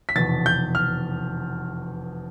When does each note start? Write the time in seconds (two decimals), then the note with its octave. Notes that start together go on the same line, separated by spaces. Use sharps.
0.09 B6
0.16 F1 E2 B2 A6
0.46 G6
0.75 F6